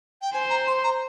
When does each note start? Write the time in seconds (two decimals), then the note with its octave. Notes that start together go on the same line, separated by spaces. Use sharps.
0.22 G5
0.33 C5 G#5
0.50 A#5
0.67 C6
0.84 A#5